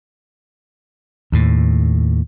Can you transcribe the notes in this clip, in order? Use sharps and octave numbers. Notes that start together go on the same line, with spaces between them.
D#2 A2